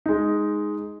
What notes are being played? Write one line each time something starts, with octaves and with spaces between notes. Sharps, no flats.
G#3 D#4